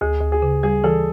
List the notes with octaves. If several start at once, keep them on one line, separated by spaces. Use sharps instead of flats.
D2 G#4
D2
G#4
C#3
G3 G#4
E3 A4